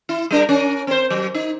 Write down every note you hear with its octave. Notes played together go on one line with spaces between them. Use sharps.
E4
G3 D4 A#4
C#4 A#4
C4 C5
F#3
D#4